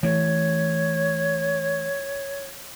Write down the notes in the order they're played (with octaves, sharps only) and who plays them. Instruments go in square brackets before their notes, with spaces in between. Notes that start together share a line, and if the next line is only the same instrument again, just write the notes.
[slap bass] E3 A3 [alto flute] C#5